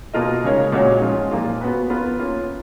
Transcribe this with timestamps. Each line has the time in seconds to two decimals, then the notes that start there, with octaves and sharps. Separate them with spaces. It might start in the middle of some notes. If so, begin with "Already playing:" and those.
0.14 B2 A#3 F4 A#4 D#5
0.44 C#3 G#3 D#4 A#4 C#5
0.72 A#2 G#3 C#4 F#4 C#5
1.02 F3 G#3 C#4 F4
1.31 A#2 F3 A#3 F4
1.61 B3 F#4 B4
1.90 B3 F4 A#4
2.19 A#3 C#4 F4